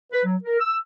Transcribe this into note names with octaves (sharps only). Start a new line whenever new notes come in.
B4
F#3
A#4
E6